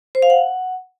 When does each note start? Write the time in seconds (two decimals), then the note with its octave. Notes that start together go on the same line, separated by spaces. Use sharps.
0.15 C5
0.22 F5
0.30 F#5